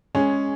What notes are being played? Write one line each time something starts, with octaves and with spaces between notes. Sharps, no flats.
G#3 C#4 G#4